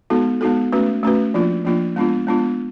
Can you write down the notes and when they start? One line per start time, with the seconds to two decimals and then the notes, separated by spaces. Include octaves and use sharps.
0.10 G#3 B3 D#4 F#4 A4
0.41 G#3 B3 D#4 F#4 A4
0.73 A3 C#4 F#4 B4
1.03 A3 C#4 F#4 B4
1.34 F3 A#3 D4 F4
1.65 F3 A#3 D4 F4
1.96 G#3 B3 D4 F4
2.27 G#3 B3 D4 F4